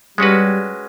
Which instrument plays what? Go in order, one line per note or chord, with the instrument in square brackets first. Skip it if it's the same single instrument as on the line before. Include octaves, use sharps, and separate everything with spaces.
[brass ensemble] G3 [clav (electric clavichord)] G#3 C#4 F#4 B4